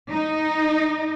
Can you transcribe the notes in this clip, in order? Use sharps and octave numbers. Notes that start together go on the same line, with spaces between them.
D#4